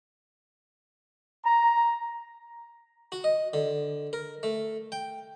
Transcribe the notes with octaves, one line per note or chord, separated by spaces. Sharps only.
A#5
F#4
D#5
D3
A#4
A3
G5